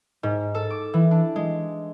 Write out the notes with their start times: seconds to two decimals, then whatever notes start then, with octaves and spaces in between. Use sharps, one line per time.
0.23 G#2
0.55 A4
0.70 D6
0.94 E3
1.11 D4
1.36 G#3